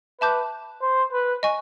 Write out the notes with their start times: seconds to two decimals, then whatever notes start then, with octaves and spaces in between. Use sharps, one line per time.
0.21 B4 E5 A5 D6 G6
0.82 C5
1.13 B4
1.43 D#5 G#5 C#6